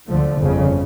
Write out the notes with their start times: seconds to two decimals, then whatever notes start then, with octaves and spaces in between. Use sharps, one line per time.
0.10 D2 D3 F3 A3
0.38 G1 F2 C#3